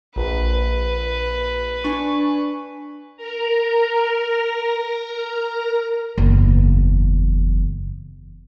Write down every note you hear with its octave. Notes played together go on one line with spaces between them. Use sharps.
A#1 B4
D4 G#5 C#6
A#4 A#5
F#1 E2